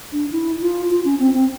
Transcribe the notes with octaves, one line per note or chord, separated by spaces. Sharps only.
D4
E4
F4
F4
C#4
C4
C4